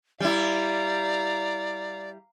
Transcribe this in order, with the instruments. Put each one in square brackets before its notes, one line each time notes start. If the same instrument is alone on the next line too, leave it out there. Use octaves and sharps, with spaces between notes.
[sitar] G3 E4 [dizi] D5 [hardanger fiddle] F5 A#5